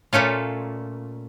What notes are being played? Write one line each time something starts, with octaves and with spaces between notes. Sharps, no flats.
A#2 A3 C#4 F4